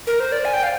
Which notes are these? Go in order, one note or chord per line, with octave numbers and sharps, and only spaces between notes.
A#4
C5
D5
G#5
G5
F5